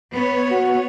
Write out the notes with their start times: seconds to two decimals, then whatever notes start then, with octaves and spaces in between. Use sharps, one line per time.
0.14 B3 B4 C#5
0.51 F#4